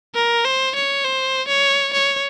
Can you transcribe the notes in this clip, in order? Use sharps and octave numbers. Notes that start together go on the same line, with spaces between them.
A#4
C5
C#5
C5
C#5
C#5